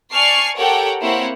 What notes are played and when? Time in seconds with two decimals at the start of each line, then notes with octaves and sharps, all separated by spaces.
0.12 D5 G#5 A5 C#6 F6 C7
0.57 G4 A4 A#4 C#5 F#5 G5
1.01 A#3 C4 E4 C5 C#5 F#5